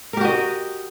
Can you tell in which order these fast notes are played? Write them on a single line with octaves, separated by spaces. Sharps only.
A#4 G4 F#4 D#5